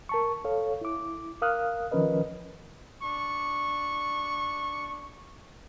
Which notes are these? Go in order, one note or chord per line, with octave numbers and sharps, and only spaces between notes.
A#4 A5 C#6
A4 C#5 F5
E4 D6
A#4 F5 D#6 F6 F#6
D#3 F3 C#4 A#4 B4 D#5
D4 C#6